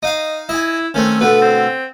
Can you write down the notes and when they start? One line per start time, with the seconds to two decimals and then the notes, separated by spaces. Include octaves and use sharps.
0.03 D#4 D#5 F5
0.49 E4 D#5 G#5
0.94 D#3 A3 C4 C#4
1.21 B2 D3 A3 B4
1.42 C4